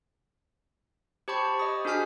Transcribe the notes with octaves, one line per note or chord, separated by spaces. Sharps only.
G4 C5 A5 B5 C#6
D#5 D#6
D4 F#4 G#4 G#5 F6 B6